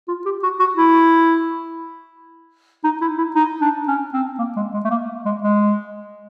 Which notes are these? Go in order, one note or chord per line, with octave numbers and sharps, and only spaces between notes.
F4
G4
F#4
F#4
E4
D#4
E4
E4
D#4
D4
C#4
C4
A#3
G#3
G#3
A3
A#3
G#3
G#3